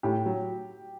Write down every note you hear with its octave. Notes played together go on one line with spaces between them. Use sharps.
A2 G4
F#3